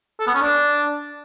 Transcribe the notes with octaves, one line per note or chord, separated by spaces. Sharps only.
A4
B3
C#4
D4